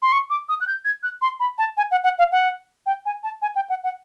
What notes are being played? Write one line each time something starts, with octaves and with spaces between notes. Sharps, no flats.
C6
C#6
D6
D#6
F#6
G6
G#6
F#6
C6
B5
A5
G#5
F#5
F#5
F5
F#5
G5
G#5
A5
G#5
G5
F#5
F#5